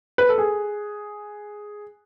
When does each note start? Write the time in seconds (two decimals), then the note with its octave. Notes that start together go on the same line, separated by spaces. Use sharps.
0.18 B4
0.29 A4
0.38 G#4